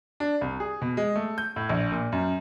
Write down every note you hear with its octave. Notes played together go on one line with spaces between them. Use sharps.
D4
C2
G#4
B2
G#3
A3
G6
A2
A#1
A#2
F#2